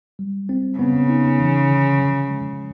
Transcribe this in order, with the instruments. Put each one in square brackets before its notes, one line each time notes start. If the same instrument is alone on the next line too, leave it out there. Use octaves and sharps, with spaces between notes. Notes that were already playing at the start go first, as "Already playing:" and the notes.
[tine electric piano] G3
C4
[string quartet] C#3 [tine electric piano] B3
[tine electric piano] D#4
E3
D3
F3
G#3